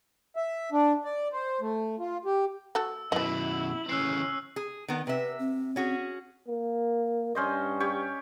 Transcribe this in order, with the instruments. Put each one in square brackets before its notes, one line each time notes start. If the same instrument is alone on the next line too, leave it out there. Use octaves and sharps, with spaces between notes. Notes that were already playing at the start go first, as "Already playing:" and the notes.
[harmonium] E5
D4
D5
C5
A3
F4
G4
[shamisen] A3 F#4 A4 [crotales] E6
[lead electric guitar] F#2 B2 [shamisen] B3 D#5 [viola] E4 [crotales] F#7
[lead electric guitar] C#3 E3 [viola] C#4 [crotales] E6 F#6 C7
[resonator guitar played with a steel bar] G#4
D#3 B3
[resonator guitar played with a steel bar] C3 E5 [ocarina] B4
[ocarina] C4
[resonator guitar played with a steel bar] C#4 F#4 G#4
[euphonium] A#3
[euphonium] G2 [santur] C#4 C5 D#5
[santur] G4 C#5